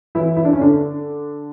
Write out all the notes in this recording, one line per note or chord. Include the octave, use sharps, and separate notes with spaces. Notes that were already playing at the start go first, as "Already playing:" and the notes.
E3 E4
E4
D4
C#4
D3 D4